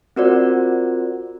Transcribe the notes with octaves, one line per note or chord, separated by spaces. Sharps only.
C4 F4 F#4 A#4 C5 D5